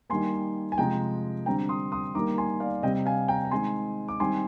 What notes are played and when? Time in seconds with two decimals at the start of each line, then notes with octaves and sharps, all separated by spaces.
0.09 D#3 G3 A#3 G#5 C6
0.72 G#5
0.78 C3 F3 G#3 G5 A#5
1.46 D3 G3 C4 G5 A#5
1.69 C6 D#6
1.92 C6 D#6
2.14 D#3 G3 A#3 A#5 D6
2.38 G#5 C6
2.60 D5 F5
2.83 C3 G3 C4 D#5 G5
3.06 F5 G#5
3.28 G5 A#5
3.45 A#5
3.51 D#3 G#3 C4 G#5 C6
4.08 D6
4.20 D#3 G3 C4 G#5 C6